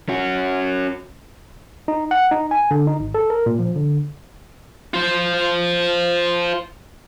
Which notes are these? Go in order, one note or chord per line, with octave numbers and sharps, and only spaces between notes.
C#4 F#4
D#4
F#5
D#4
G#5
D3
D#4
G#1
A4
A#4
A#2
F3
D3
F4 C5